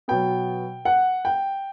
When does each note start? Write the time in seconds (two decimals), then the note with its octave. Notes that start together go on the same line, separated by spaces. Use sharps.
0.08 B2 F#3 B3 G5
0.85 F#5
1.25 G5